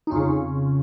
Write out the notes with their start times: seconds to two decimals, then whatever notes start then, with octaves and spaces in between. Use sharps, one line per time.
0.07 D#4
0.11 F2 C#3 C#4 F4